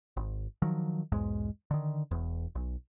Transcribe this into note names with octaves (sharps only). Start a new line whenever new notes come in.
G#1
D#3 F3 F#3
B1 E2 G#2 G#3
D3 D#3
E1 E2
B1